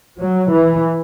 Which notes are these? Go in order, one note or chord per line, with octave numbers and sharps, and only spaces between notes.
F#3
E3